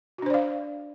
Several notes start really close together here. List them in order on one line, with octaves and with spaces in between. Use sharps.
F#4 D4 C5 D5 F5